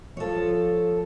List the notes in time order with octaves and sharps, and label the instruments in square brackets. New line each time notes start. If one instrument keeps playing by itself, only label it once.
[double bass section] F3 [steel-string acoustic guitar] A4 C#5